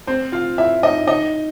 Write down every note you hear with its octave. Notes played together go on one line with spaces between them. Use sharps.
C4 C5
F4 F5
E4 E5
D#4 D#5
D#4 D#5